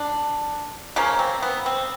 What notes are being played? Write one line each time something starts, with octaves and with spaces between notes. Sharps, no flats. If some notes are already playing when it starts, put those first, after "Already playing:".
Already playing: D4
C#3 F3 A#3 C#4
C4
B3
C4